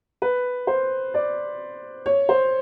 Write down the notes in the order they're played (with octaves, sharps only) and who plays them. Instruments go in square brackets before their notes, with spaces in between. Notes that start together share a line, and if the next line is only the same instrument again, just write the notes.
[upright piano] B4
C5
D5
C#5
C5